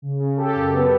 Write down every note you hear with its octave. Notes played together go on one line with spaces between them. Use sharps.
C#3
C#3
C#3 G4 A4
F#2
B3